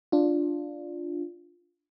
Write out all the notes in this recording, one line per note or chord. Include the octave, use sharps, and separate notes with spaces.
D4 F4